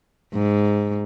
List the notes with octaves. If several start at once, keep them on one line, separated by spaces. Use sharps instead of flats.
G#2